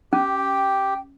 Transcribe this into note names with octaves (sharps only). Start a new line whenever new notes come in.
C#4 G4
G5